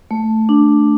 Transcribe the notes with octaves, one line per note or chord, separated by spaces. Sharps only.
A3
D4